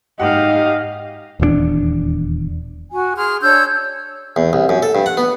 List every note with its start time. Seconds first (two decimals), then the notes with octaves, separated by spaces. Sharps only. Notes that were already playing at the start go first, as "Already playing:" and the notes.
0.20 G#2 G4 D#5 F5 F#5
1.40 D#1 E2 F3 D4
2.92 F#4 G#5
3.16 G#4 C6 F6
3.41 D4 C#5 E6 G6
4.36 E2
4.53 C2
4.69 F#2
4.83 A4
4.95 G2
5.06 F#5
5.17 B3